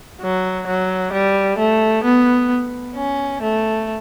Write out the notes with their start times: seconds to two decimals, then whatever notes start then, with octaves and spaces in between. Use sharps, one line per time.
0.22 F#3
0.67 F#3
1.13 G3
1.58 A3
2.04 B3
2.96 C#4
3.42 A3